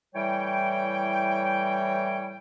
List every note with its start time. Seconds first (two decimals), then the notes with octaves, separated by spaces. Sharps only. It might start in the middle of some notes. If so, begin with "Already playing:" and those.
0.15 A2 E3 G3 C#5 G5